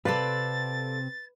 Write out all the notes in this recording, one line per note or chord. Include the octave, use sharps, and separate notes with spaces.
C3 C4 A4 B4 D5 F5 A6